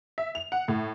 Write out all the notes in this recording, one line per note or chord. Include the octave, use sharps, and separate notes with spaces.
E5
F7
F#5
A2